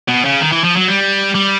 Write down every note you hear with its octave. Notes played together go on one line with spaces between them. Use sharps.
B2
C#3
D#3
E3
F3
F#3
G3
G3